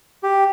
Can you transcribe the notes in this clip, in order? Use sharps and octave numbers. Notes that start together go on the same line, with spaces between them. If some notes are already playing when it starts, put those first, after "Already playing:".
G4